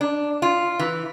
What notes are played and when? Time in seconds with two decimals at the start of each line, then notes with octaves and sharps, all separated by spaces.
0.01 D4
0.42 F4
0.79 E3